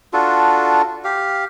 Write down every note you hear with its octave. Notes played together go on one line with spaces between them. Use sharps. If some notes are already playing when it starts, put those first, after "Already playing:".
D4 F4 F#4 A4
G4 F5